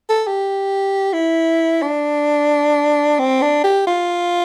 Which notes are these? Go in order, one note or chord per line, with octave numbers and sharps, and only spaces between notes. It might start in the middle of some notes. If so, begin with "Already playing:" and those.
A4
G4
E4
D4
C4
D4
G4
F4